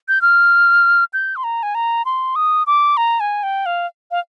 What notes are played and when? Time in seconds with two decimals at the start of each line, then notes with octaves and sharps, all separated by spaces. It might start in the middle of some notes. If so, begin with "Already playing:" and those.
0.08 G6
0.22 F6
1.13 G6
1.36 C6
1.44 A#5
1.63 G#5
1.75 A#5
2.05 C6
2.36 D#6
2.67 D6
2.97 A#5
3.20 G#5
3.43 G5
3.66 F5
4.11 F5